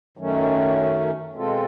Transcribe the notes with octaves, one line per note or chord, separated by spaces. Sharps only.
F#2 D#3 F#3 A3 C#4
B2 G#3 C4 F4 A4